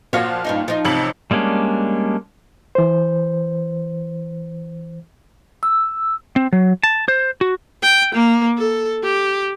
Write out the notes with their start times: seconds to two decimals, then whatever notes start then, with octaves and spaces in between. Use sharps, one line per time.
0.13 A#2 F3 F#4 C#5 F5
0.45 G2 C#4 D#4
0.68 F3 D#4
0.85 A1 C3 F#7
1.31 G3 G#3 A#3 C#4 D4
2.75 E3 C5
5.63 E6
6.36 C4
6.53 F#3
6.83 A5
7.08 C5
7.41 F#4
7.83 G5
8.15 A#3
8.58 A4
9.03 G4